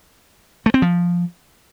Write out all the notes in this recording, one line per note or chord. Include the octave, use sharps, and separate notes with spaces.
A3
C4
F3